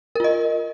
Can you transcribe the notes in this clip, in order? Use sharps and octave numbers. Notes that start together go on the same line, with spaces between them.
F4 A#4 D#5